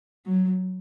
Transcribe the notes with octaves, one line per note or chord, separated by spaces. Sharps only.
F#3